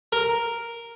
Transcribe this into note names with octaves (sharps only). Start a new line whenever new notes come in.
A#4